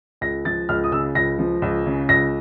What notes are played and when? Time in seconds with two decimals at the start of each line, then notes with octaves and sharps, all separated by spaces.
0.21 C#2 A#6
0.45 F3 A6
0.69 C#2 F6
0.84 D#6
0.92 C#3 E6
1.15 C#2 A#6
1.39 F3
1.62 C#2
1.86 C#3
2.09 C#2 A#6